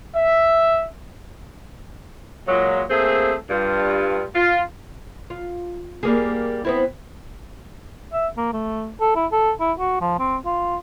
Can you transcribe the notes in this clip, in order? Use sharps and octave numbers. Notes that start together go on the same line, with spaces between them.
E5
A#2 F#3 G#3
A3 A#3 C4 G#4
G2 F4
F4
F4
G3 A#3 G#4
B3 C4 E4
E5
A#3
A3
A4
E4
A4
E4
F#4
F3
C4
F4